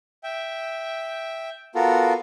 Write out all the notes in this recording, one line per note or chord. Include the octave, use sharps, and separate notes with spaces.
E5 G5
B3 F4 F#4 A4 A#4